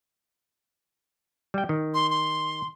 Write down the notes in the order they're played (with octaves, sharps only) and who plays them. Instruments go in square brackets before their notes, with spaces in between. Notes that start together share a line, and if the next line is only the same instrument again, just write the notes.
[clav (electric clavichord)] G3 G5
D#3
[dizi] C6
C6